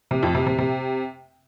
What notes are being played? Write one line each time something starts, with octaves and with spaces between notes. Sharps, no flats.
C3
F2
C3
C3
C3